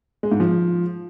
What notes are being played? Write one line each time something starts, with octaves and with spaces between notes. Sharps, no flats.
G#3
G#2
F3